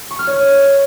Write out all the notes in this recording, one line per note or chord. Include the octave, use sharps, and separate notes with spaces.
C#6
F6
C#5